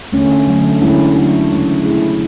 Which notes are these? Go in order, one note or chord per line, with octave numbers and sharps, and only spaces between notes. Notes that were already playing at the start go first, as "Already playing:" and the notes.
D3 A3 C#4
D3 F#3 A3
D3 G#3 C#4 E4
D3 F#3 A3 D4 F#4
C#3 E3 G#3
B2 A3 E4 G#4